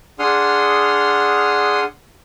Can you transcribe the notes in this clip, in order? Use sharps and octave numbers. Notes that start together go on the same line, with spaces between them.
D4 G#4 F#5 C6 D#6 F6